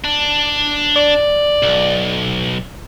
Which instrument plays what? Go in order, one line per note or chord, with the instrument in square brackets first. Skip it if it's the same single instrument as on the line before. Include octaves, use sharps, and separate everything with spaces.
[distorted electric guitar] D4
[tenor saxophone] D5
[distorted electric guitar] B1